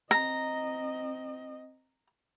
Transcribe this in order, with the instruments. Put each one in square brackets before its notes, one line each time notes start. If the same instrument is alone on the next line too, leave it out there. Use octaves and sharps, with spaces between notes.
[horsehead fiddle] C4 D#5 [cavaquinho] A#5